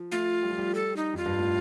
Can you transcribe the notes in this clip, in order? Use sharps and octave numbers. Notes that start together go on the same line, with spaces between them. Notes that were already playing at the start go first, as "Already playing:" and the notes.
Already playing: F3
A3 F4
G3
F3
G3
A4
D#4
F2 F4
G2
A2